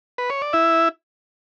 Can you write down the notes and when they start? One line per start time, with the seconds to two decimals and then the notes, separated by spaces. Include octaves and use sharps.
0.18 B4
0.30 C#5
0.42 D5
0.53 E4 E5